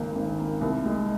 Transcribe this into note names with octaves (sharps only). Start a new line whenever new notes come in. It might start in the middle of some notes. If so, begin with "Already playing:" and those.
Already playing: G#1 C#2 A#3
G#1
A#3
C2
G#3